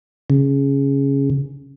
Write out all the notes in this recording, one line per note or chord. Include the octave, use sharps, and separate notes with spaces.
C#3